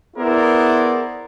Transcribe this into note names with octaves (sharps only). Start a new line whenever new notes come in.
B3 E4 G#4 A#4 C5 D5